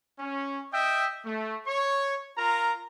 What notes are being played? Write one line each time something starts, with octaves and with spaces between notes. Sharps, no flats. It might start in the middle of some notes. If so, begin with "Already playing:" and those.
C#4
D#5 E5 G5
A3
C#5 C#6
F4 A#4 A#5